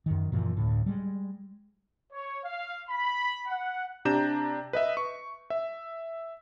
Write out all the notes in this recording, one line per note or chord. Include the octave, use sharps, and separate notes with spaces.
F#2 D#3
F#2 A#2 E3 F3
D2 A2
G3 G#3
C#5
F5
B5
F#5
C3 D4 G4 A#5 G6 E7
B4 D#5 E5
C#6
E5